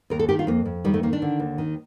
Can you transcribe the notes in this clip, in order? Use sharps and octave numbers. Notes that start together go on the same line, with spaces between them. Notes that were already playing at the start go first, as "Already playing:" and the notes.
D#2 A#4
A4
D#3 G4
F4
F2 A#3
F2
D#3 G3
A3
D#3 A#3
D4
D3
D#2
D#3